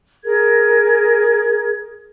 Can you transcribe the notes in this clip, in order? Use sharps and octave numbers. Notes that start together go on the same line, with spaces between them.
G#4 A#4 G#6